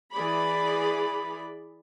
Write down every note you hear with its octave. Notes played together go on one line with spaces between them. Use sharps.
E3 G#4 D5 B5